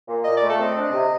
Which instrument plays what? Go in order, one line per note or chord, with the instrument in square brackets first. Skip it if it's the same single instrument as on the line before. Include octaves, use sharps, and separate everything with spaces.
[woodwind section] A#2
[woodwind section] A#2 [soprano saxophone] D#5
[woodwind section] A3 [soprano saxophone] D5
[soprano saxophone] A4
[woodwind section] C4 [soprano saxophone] D#5
[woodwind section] D4
C3